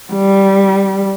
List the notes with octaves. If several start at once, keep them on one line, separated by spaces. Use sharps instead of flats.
G3